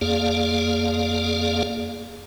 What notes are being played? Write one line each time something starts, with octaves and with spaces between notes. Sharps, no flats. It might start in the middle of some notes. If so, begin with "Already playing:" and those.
F2 A#3 G#4 D5 F5